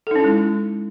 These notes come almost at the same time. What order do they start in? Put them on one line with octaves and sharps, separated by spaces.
A4 D#4 C#4 E4 G#3